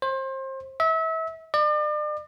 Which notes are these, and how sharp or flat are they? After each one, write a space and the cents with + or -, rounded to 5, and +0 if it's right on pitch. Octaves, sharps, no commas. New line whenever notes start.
C5 +30
E5 -30
D5 +40